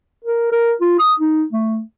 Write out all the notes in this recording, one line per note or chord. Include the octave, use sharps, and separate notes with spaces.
A#4
A#4
F4
D#6
D#4
A3